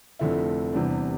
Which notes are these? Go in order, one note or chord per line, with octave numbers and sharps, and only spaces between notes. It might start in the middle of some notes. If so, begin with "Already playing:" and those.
F1 F2 D3 A3 E4
E2 C3 E3 G3 D4